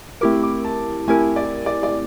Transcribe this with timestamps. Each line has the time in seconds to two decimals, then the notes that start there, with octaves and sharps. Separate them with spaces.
0.21 A3 C4 E4 G4 A#4 D6
0.43 D6
0.65 A5
1.08 A3 C4 E4 G4 A#4 G#5
1.36 D5
1.66 D5
1.83 D5